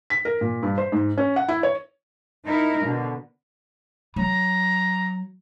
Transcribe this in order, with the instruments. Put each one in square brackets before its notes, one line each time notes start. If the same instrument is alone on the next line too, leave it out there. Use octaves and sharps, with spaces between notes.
[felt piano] B6
A#4
A#2
G2
C5
G#2
C#4
F#5
E4
C#5
[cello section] D#4 E4 A#4
B2 D3
[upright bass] F#3 [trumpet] A#5